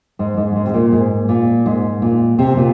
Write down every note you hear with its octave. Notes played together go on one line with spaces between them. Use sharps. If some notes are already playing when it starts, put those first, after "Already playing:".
G#2
G#2
G#2
C3
A#2
G#2
A#2
G#2
A#2
C3
A#2